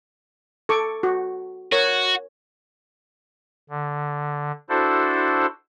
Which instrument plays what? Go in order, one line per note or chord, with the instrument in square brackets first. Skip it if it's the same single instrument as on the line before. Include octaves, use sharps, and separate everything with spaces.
[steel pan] A4 C#6 D6
F#4
[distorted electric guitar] F#4 [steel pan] A#4 C#5
[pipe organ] D3
D4 E4 F#4 A4 C5